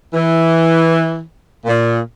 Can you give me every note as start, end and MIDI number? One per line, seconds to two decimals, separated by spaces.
0.13 1.20 52
1.65 1.97 46